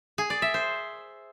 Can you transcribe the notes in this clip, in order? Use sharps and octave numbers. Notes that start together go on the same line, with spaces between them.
G#4
D5
E5
C5